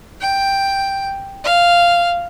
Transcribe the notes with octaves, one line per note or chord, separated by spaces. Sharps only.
G5
F5